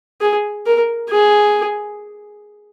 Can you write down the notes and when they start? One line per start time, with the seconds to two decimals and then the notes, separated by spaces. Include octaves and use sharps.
0.21 G#4
0.66 A#4
1.10 G#4